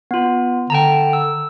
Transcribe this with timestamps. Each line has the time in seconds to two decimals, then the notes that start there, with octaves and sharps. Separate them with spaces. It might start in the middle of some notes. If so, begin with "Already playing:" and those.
0.11 B3 F4
0.70 D3 G5 A5 A#5
1.13 E6